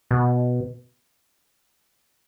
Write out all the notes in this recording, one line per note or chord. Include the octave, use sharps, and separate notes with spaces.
B2